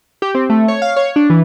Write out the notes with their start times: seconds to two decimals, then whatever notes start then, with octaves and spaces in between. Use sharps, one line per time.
0.22 G4
0.35 C4
0.50 A3
0.68 C#5
0.82 F5
0.96 C#5
1.16 D4
1.30 E3